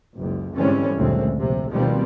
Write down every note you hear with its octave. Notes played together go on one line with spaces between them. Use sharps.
F#1 C#2
G#2 D3 E3 G3 C4 C#4
F#1 D2 A#2 G#3 A3 C4
A#1 C3
B2 D#3 F3 G3 A#3 C4